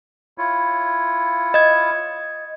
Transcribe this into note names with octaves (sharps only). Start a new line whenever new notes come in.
E4 F4 C#5
D#5 G#6